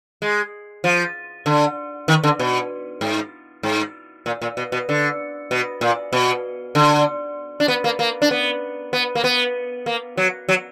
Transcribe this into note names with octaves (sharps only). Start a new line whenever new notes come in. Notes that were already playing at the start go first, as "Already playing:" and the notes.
G#3
F3
D3
D#3
D3
B2
G#2
G#2
A#2
A#2
B2
B2
D3
B2
A#2
B2
D3
D4
B3
A#3
A#3
D4
B3
B3
A#3
B3
A#3
F#3
F#3